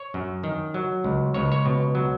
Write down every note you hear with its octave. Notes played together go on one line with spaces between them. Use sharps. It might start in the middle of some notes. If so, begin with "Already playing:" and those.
Already playing: C#5
F#2
D#3
F#3
C#2
C#2 C#5
C#5
B2
F#3